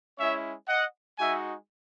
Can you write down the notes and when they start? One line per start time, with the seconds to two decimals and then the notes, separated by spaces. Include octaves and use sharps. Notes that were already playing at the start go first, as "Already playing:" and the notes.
0.18 G#3 C#4 E4 C#5 E5
0.68 D#5 F#5
1.18 G#3 D#4 F#4 E5 G#5